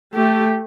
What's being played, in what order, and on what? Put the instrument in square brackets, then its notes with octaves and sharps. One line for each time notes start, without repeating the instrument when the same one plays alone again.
[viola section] A3 [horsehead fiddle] G4